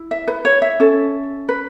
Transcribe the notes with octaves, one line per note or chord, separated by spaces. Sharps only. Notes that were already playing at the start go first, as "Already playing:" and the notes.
Already playing: E4
E5
B4
C#5
E5
C#4 A4
B4